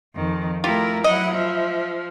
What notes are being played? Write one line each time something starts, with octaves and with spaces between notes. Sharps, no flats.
F2 D#3
A3 E4 F4 G4 A#4
F#3 E4 D#5 F#5
F3 E5